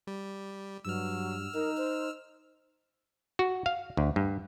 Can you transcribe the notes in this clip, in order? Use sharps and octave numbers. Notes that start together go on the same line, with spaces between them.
G3
G2 F#3 E6 F6
D#4 A#4
C5
F#4
F5
D2
G2